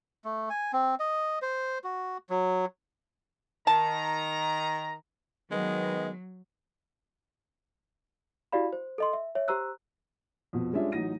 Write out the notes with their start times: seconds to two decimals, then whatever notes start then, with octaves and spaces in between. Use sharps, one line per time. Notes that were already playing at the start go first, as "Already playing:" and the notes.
0.25 A3
0.50 G#5
0.73 C4
1.00 D#5
1.42 C5
1.84 F#4
2.29 F#3
3.67 D#3 A5 A#5
5.51 D#3 F#3 G#3 B3 D#5
8.52 E4 F#4 G4 D5 F5 B5
8.73 C5
8.98 A4 D#5 C6
9.13 E5
9.35 C#5 E5
9.48 G4 C5 A#5 E6 F#6
10.53 F2 B2
10.73 G3 G#3 C#4 D4 F4 E5
10.92 A1 E3 F#3 D#4 A#6 D#7